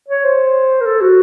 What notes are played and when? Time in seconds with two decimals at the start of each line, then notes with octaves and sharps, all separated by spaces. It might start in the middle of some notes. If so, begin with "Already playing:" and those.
0.08 C#5
0.24 C5
0.81 A#4
0.86 A4
1.01 F#4